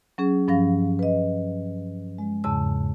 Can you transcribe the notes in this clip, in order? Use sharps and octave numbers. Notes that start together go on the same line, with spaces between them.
F#3 C#4 G#4
G2 F3 C#4 F5 A#6
B4 D#5
G#3
E2 G#2 C#3 A5 E6